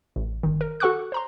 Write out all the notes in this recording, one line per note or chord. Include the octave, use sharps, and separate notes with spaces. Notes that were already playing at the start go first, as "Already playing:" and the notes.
A1
G1 D#3
A#4
F#4 A4 F#5 C#6 D6 F#6
C5 A#5 C6